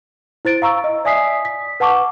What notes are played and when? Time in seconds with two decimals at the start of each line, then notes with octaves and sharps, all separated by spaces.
0.45 E4 C5 A6 D7
0.62 F5 A#5 C#6 E6
0.84 D#5
1.05 D5 E5 G#5 D#6 B6 C7
1.45 B6
1.80 B4 F#5 A5 C#6 D6